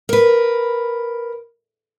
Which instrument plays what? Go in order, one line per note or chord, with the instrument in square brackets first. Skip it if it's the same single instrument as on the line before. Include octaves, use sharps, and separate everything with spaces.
[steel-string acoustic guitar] A#4 B4